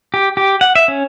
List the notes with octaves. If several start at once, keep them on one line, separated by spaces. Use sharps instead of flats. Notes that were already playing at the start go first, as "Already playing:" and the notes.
G4
G4
F#5
E5
C#4